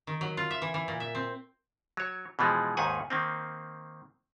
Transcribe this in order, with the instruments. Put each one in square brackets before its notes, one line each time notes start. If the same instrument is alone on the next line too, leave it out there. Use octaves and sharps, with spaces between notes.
[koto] D#3
F#3
F4
E5
E3
E3
A#2
E5
C4
[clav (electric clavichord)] F#3 C#5
B2 E3 F3 G#3
D#2 G#2 D#3 F#5 G#5
D#3 A#3 C4